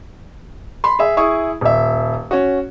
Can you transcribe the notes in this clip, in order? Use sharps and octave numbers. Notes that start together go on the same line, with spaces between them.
B5 C6
G#4 E5
E4 G#4 C#6 D#6
D#1 E5
C#4 F#4